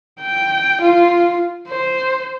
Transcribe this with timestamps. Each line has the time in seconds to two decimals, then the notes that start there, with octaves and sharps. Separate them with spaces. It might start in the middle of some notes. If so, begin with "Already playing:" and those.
0.22 G5
0.81 F4
1.69 C5